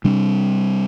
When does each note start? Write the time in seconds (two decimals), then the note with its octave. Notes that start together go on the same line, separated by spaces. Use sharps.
0.04 C3 G3 C4 D4